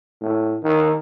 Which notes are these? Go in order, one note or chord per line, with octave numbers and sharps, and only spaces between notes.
A2
D#3